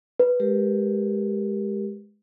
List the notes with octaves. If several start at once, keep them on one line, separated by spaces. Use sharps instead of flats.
B4
G#3 G4 A#4